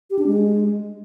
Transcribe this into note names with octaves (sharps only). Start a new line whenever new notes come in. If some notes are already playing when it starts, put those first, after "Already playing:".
G4
D4
G#3